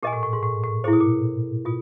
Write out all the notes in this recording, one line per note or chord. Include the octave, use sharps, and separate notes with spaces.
A#2 G4 A#4 D#5 G#5
A2
A2
G#2
A2
A2
A#2 E4 G#4 C5
B2
A#2
B2 F4